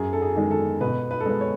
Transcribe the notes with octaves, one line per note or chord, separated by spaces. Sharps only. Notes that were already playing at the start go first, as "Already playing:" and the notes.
Already playing: F#2 G#4
A4
G#4
D#3 G#3
A4
B2 B4
B4
A4
G#3 B4
C#5